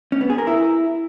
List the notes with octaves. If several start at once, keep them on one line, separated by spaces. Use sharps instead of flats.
C#4
B3
G#4
A#4
E4